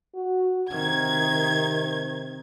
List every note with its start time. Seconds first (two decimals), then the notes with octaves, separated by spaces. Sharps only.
0.14 F#4
0.70 C3 D#3 G#6